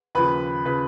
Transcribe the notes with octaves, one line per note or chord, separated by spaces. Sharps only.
D#2 C#3 F3 B4 B5
C#3 F3 B4 B5